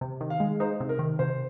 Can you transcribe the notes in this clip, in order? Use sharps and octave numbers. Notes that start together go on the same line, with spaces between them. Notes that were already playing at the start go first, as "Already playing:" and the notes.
C3
D#3
F5
G#3
D#4 C5
C3
A#4
D#3
C3 C5